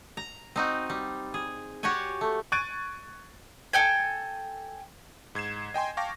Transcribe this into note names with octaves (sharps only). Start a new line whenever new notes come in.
A#5
C4 D#4 F#4
G3
G#4
F#4 G4 C#5 D5 G#5
A3
C#6 F#6 G#6 A6 D7 D#7
A4 G5 G#5
G#2 G#6 C7 E7
D#5 G5 G#5 C6
F5 G5 A5 C#6 D6 A#6